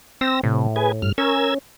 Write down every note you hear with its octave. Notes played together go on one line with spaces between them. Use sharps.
C4 E6 A#6
A2 C3
G#4 B4 G#5
G2 F6
C#4 A#4 E6 G#6